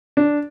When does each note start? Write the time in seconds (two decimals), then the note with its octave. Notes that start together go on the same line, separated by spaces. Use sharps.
0.17 D4